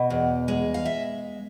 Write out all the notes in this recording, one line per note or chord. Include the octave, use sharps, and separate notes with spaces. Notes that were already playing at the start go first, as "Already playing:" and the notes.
Already playing: B2 D#5
E2
G#3
F5
E5